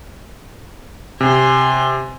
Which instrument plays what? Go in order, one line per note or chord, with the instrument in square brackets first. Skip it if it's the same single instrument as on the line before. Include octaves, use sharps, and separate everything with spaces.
[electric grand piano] C3 [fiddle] G#5 C6